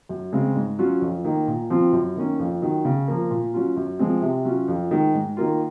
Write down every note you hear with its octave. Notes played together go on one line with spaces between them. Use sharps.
F#2
C#3 G#3 C4
G#2
F#3 C#4 F4
F2
D#3 A#3
A#2
F3 C4 F4
F#2
D#3 A#3 C#4
F2
D#3 F#3
C#3
F3 A#3
A#2
F#3 C#4 F4
F#2
F3 G#3 C4
C3
F#3 C#4 F4
F2
D#3 G#3
G#2
D#3 A#3 F4